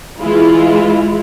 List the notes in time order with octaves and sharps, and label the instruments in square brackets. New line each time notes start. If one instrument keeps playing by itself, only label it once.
[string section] E3 G#3 E4 F4